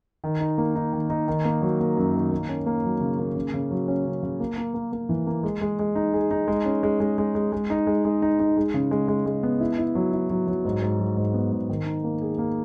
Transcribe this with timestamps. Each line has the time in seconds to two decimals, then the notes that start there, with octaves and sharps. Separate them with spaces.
0.24 D#3
0.40 D#4
0.58 A#3
0.75 D#4
0.93 D#3
1.10 D#4
1.28 D#3
1.45 A#3
1.62 F#3
1.80 A#3
1.97 F#2
2.14 D#3
2.31 A#3
2.49 C#4
2.66 A#3
2.84 F#3
3.01 C#3
3.19 A#3
3.36 C#3
3.54 C#3
3.71 F#3
3.88 C#4
4.05 C#3
4.23 C#3
4.40 A#3
4.57 A#3
4.74 A#3
4.92 A#3
5.09 E3
5.27 A#3
5.43 G#3
5.61 G#3
5.79 G#3
5.96 D#4
6.14 G#4
6.31 D#4
6.48 G#3
6.65 C#4
6.83 G#3
7.00 G#3
7.18 G#3
7.35 G#3
7.52 G#3
7.70 D#4
7.87 G#3
8.05 G#3
8.22 D#4
8.40 D#4
8.57 G#3
8.74 C#3
8.91 G#3
9.08 G#3
9.26 G#3
9.43 B3
9.60 E4
9.79 E4
9.95 F#3
10.13 E4
10.30 F#3
10.47 F#3
10.65 G#2
10.82 G#2
11.00 F#3
11.17 G#2
11.34 B3
11.52 G#2
11.69 D#3
11.86 D#4
12.04 A#3
12.21 G#4
12.38 A#3